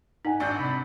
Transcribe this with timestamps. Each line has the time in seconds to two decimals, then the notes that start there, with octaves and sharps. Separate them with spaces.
0.25 D#4 D#5 F#5 G#5
0.40 G#1 D4 C#6 E6 G6
0.59 C2 B5